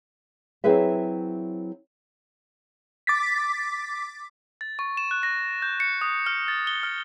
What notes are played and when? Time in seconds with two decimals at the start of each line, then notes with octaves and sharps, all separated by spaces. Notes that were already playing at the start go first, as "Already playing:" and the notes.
0.64 F#3 C4 E4 G#4 B4 E5
3.07 D6 A6 B6
4.61 A6
4.79 C#6
4.97 E7
5.11 F#6
5.23 A#6
5.62 G6
5.80 C#7
6.01 D#6
6.26 F6
6.48 A6
6.67 G7
6.83 F6